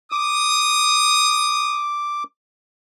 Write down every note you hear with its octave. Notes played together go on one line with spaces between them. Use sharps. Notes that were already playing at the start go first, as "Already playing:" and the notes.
D6 D#6